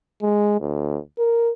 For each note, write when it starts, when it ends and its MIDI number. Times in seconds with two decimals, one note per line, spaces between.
0.22 0.60 56
0.61 0.98 38
1.19 1.52 70